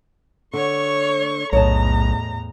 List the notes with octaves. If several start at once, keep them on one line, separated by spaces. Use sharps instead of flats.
D3 C#5 C#6
B1 E2 A2 C#5 D#5 A5 A#5